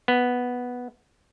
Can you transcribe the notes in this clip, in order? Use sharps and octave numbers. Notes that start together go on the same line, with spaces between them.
B3